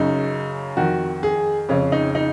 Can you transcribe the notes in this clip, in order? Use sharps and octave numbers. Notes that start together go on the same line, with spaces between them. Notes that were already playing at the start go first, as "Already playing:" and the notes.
Already playing: F#2 C#3 D#4
F2 D#3 F#4
G#4
F2 C#3 C#4
D#4
D#4